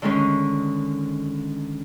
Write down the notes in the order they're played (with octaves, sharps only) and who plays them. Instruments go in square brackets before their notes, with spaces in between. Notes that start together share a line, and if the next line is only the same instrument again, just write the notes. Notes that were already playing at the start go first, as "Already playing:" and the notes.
[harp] D3 D#3 G#3 C#4